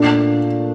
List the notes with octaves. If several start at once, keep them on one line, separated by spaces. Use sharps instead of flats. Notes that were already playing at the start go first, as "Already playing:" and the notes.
Already playing: A#2 A3 D4